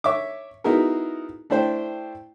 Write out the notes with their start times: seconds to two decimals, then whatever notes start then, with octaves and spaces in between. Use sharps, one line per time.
0.04 C#5 E5 C#6 D6
0.64 B3 D#4 E4 F#4 G#4 A#4
1.50 A3 D4 E4 C5 G5